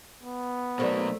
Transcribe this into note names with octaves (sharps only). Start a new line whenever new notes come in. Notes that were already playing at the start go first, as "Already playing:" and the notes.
B3
B2 F#3 A3 A#3 C5 D5